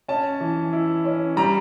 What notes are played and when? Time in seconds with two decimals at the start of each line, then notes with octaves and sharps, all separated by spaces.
0.08 C#4 A5
0.41 E3
0.73 E4
1.05 C#4
1.37 G3 A#5